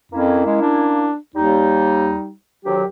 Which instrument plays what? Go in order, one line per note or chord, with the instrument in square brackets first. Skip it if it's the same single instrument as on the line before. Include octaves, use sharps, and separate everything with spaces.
[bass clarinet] F2 [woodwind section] A#3 C#4 E4
[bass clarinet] G#3
D4
[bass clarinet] D#2 [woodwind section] G3 D#4
[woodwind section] D2 D#3 F#3 [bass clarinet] G4